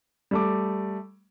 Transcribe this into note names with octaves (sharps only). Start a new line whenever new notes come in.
G3 A3 D6